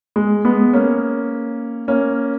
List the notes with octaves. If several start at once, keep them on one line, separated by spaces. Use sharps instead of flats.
G#3
G#3 B3
A#3 C#4
A#3 C#4